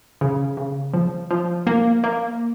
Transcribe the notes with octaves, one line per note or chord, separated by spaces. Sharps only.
C#3
C#3
F3
F3
A#3
A#3